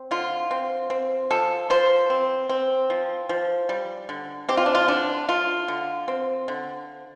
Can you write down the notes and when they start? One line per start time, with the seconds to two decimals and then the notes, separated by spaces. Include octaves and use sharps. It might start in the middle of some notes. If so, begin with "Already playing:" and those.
Already playing: C4
0.11 D3 F4
0.51 C4
0.90 C4
1.30 F3 A4
1.70 F3 C5
2.10 C4
2.49 C4
2.90 F3
3.29 F3
3.69 G3
4.09 D3
4.49 C4 G4
4.57 F4
4.66 D4
4.75 F4
4.88 D3 D4
5.28 A3 F4
5.68 D3
6.08 C4
6.48 D3